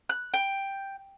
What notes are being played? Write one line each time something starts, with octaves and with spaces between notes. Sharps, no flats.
F#6
G5